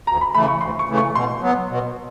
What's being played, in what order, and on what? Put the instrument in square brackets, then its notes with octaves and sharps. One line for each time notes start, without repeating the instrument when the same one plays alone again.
[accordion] D2 [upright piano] A#5
[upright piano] B5
[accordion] C#3 E3 A3 [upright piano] B5
[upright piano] C#6
[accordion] D2 [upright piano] C6
[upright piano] C#6
[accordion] C#3 E3 A3
[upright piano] C#6
[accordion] B2 [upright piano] C6
[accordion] F#3 B3
B2